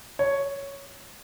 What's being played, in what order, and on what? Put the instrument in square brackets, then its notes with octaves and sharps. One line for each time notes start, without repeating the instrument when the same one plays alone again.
[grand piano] C#5